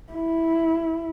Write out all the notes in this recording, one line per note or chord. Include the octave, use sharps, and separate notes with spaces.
E4